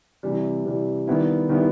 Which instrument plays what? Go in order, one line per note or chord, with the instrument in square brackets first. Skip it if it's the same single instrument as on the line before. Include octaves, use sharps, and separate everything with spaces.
[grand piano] C3 E3 G3
C3 E3 G3
D#3 G3 B3 E4
D#3 G3 B3 E4